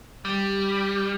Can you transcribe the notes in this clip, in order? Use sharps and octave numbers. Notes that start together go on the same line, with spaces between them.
G3